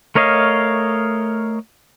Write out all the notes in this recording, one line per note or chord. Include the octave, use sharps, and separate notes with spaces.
A3 A#4 C#5 D#5 F5